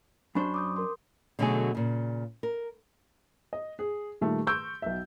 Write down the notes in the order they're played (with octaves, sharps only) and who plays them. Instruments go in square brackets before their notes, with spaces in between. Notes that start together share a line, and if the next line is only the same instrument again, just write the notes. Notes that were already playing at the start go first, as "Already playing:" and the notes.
[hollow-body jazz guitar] F#2 D4 C5 [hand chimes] B5 C#6
[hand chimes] D6 D#6 G6
A#4 C6
[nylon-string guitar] B2 D3 F#3 A3 F#4 G#4
A#2 C#3
A#4
[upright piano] D#5
G#4
A#2 D#3 G3 A3
C6 C#6 E6 G6 D7
B1 E5